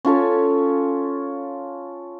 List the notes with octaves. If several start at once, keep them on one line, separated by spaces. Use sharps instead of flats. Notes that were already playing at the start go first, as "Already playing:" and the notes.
C#4 F4 A4 C#5